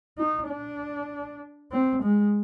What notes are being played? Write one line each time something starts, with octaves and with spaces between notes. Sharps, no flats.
D#4
D4
C4
G#3